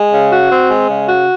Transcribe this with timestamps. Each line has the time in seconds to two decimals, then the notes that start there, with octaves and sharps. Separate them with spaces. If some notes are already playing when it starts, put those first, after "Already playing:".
Already playing: G#3
0.12 C#3
0.31 F#4
0.50 C4
0.70 G#3
0.88 C#3
1.07 F#4